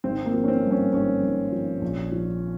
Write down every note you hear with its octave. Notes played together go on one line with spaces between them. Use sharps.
G#1 C4
A#3
F3
C#4
C4
G2
C#4
G#1 C#4
G#1
F3
A#1
F3